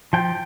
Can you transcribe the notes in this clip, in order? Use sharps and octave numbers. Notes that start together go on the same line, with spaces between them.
F3 G5